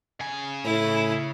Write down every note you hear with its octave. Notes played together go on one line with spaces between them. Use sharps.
C#3 G#5
A2 E4